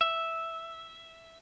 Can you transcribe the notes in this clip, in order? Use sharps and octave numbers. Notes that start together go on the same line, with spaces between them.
E5